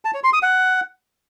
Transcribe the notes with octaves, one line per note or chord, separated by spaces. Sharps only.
A5
C#5
C6
D#6
F#5